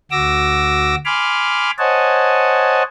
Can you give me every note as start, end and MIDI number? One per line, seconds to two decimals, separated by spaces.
0.11 0.95 38
0.11 0.95 66
0.11 0.95 86
0.11 0.95 88
0.11 0.95 94
1.05 1.71 80
1.05 1.71 83
1.05 1.71 84
1.05 1.71 86
1.05 1.71 89
1.78 2.83 72
1.78 2.83 73
1.78 2.83 75
1.78 2.83 78
1.78 2.83 80
1.78 2.83 81